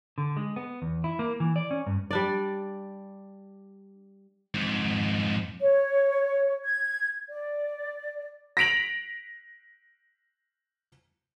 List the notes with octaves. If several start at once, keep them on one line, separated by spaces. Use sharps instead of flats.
D3
G#3
B3
E2
E4
A#3
E3
D5
C#4
G2
G3 D4 D5
F2 G#2
C#5
G#6
D5
A#6 B6 D7 F7 F#7